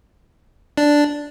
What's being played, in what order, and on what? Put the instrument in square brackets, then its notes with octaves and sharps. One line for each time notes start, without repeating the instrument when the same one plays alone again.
[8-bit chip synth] D4